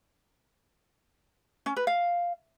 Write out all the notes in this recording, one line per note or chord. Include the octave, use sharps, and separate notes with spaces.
C#4
B4
F5